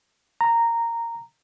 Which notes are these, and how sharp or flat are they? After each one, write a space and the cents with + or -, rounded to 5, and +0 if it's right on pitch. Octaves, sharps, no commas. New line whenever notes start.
A#5 -10